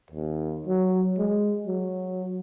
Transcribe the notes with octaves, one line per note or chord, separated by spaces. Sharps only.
D#2
F#3
G#3
F#3